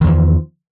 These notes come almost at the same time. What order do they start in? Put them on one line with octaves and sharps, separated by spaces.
D#3 E2 F3